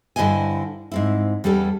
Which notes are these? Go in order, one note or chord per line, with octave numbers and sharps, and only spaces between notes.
G2 D3 E4 C5 D#5 G#5
G#2 C4 E4
E2 G3 B3 C#4 A4